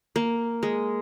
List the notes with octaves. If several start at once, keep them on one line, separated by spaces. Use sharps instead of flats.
A#3
G#3